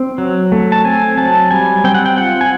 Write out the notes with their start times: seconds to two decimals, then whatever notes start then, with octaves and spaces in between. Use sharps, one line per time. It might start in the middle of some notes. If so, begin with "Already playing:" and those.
Already playing: C4
0.18 F#3
0.52 A3
0.72 A5
0.85 C4 G#5
1.17 F#3 A5
1.51 G3 G#5
1.84 C4 G5
1.94 F#5
2.06 G5
2.17 F4 F#5
2.41 G#5